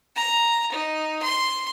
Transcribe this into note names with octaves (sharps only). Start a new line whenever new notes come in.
A#5
D#4
C6